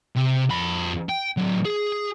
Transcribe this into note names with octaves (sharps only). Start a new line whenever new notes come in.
C3
F2 B5
G5
A2 F#3
G#4